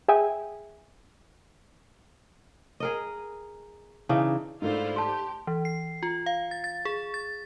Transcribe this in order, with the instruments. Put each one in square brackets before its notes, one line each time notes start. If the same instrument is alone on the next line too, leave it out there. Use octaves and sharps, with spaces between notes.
[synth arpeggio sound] G#4 E5 G5 G#5
[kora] G#4 A#4 D#5
C#3 E3 D4 D#4
[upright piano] G#2 A3 D4 [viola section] E4 F4 C5
[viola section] G4 [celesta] A5 C6
[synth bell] E3
C7
F4
F5
A6
A6
G#4
A6